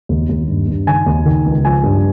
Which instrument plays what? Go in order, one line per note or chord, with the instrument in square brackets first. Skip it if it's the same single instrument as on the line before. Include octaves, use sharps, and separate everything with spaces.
[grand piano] D#2
D#2
G2
G2
D#3 G#5
D#2
D#3
C#2
F3 G#5
G2